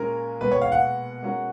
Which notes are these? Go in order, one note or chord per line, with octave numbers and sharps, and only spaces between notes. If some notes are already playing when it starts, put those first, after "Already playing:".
Already playing: A#2 G#3 C#4 A#4
B2 G#3 B3 B4
C#5
F5
F#5
G#3 C#4 F#4 A#4